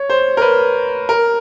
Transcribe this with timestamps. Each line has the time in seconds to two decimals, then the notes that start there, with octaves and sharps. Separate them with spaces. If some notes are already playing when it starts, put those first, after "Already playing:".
Already playing: C#5
0.10 C5
0.37 A#4
0.42 B4
1.09 A#4